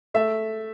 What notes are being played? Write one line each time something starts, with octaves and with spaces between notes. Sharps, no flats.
A3 E5